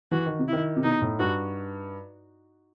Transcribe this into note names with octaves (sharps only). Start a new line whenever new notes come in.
E3 F#4
D#3
C3
D#3 E4
C3
B2 D#4
A2
G2 F#4